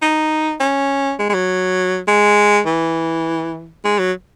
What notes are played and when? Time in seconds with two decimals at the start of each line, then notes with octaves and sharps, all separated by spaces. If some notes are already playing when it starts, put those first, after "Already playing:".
0.02 D#4
0.60 C#4
1.19 G#3
1.29 G#3
1.34 F#3
2.08 G#3
2.66 E3
3.85 G#3
3.99 F#3